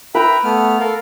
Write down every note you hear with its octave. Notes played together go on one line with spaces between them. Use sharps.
B4 E5 G5 A#5
A3 B3 F6
A4 A#4 F5